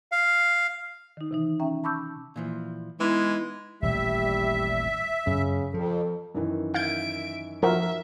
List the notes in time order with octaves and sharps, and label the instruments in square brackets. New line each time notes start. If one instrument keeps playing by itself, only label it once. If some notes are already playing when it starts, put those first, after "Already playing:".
[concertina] F5
[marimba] D#3 D#4
C3 E3 D#4
C#4 E5 G5 A#5
A5 B5 C#6 D6 E6 G6
[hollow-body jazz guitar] A#2 E3 F3
[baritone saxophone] E3 [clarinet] G#3 [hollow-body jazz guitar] B3 D#4 [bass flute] E4
[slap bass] D#1 A1 D#2 [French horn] G3 [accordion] E5
[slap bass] F#2 [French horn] C#3
[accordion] F2 [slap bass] F3 [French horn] A4
[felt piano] F#2 D#3 E3
[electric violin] E5 D7 [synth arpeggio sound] F5 G6 G#6
[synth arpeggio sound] F3 F#4 [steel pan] A#4 [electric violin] E5